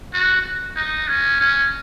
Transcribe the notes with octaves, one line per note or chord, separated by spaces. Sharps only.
F#4
D#4
C#4
C#4